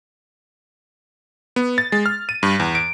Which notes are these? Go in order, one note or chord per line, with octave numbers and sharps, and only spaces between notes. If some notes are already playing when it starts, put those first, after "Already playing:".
B3
A6
G#3
F6
D#7
G2
E2
D7